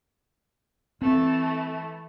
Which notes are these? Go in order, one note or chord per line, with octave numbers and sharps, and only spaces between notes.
E3 A3 C4